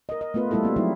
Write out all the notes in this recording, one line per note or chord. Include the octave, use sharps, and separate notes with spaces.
A#4 D#5
D#5
A3 B3 F4 B4
G3 A3 E4 F4 A4
A#3 C4 F#4
F3 F#3 G#3 D#4 E4